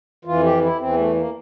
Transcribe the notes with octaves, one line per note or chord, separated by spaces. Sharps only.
F2 E3 F4
G4
E4
E2 E3 C4
A3
A#3